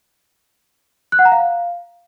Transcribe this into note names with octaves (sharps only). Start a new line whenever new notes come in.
F#6
F#5
A#5
F5